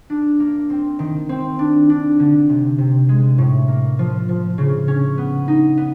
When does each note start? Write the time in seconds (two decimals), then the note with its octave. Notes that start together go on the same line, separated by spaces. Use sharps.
0.10 D4
0.40 A#3
0.70 C4
0.99 D#3
1.29 C4
1.59 D4
1.90 D4
2.19 D3
2.49 C3
2.78 C3
3.09 G#3
3.38 A2
3.68 A#3
3.99 F3
4.29 F3
4.58 C#3
4.88 C#4
5.18 B3
5.48 D#4
5.77 B3